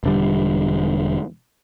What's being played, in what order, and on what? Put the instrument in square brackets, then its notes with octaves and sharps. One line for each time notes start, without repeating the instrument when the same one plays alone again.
[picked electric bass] E1 D3 G3